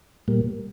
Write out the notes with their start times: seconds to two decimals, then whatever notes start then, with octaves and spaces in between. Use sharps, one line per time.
0.28 A#2 G3 A#3